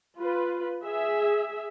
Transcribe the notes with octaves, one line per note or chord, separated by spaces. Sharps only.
F4 B4
G#4 E5